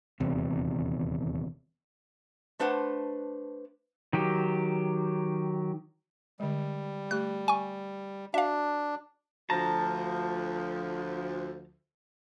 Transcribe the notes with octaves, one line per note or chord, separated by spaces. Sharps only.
D#1 E2 C3
A3 D4 B4 C5 F#5
D#3 F#3 G4
D3 G3 G#3
A3 G4 F#6
G#5 C#6
D4 F#4 E5 F5
D2 F3 A5 A#5